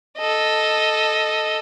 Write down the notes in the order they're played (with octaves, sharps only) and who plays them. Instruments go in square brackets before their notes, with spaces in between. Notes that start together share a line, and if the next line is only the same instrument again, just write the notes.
[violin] A4 D#5